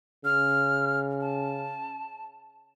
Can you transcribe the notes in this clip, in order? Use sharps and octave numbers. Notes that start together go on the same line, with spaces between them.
C#3 F6
A5